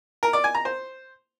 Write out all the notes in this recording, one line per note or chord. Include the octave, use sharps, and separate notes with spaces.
A#4
D5
G#5
A#5
C5